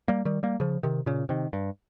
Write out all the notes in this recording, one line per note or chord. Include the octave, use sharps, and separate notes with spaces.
G3 A#3
D#3 G3
G3 A#3
C#3 F3
C3 D#3
A#2 C#3
C3 D#3
G2